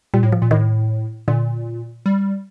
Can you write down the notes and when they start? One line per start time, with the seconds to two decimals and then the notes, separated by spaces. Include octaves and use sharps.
0.14 A#2 G3
0.23 A2
0.32 F3
0.42 A#2
0.51 A2 D#3
1.28 A#2 D3
2.06 G3